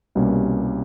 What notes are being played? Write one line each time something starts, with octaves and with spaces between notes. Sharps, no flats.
C2 B2 G3 A#3 C#4